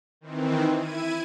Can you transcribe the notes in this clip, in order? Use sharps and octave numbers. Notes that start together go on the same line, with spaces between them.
D#3 E3 C4
E4 G#6 D#7